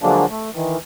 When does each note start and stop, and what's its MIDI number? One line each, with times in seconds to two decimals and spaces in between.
0.02 0.26 50
0.02 0.26 53
0.02 0.26 54
0.02 0.26 56
0.02 0.26 58
0.02 0.26 62
0.30 0.50 57
0.54 0.77 51
0.54 0.77 52